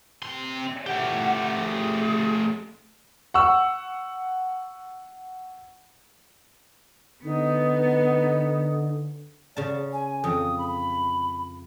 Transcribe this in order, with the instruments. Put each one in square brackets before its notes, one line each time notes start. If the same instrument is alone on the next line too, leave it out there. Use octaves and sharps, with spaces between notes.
[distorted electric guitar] C3 C6
[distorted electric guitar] A3 G4 [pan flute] F#5
[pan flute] G#4
[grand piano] F#5 C#6 E6
[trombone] D3 [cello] B3 [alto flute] D#4
[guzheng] C#3 A5 [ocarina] D5
[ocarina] G#5
[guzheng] F2 [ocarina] D#6
[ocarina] B5